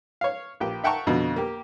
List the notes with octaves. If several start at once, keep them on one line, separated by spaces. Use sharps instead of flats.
C#5 F5
A#1 G4 G5
E5 F#5 G5 A5 A#5 C#6
F2 B2 D3
A#3 G4